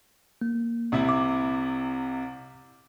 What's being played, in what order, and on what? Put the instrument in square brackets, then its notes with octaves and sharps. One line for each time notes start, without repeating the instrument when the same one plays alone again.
[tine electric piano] A#3
[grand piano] C2 C3 E4
[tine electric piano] D6